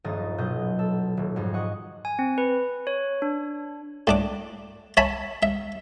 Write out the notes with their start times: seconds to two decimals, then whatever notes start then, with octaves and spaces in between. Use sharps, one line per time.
0.04 D#1 A#1 G2 A#3 D#5 A6
0.38 B1 B2 F#3 D#5 G6
0.79 A4
1.17 D#1
1.36 F2 G#2 G3
1.54 D#5 F#5 C#6
2.05 G#5
2.19 C4
2.38 B4
2.87 C#5
3.22 D4
4.07 A2 D4 D6
4.97 C#5 E5 G#5 A5 B5
5.43 E5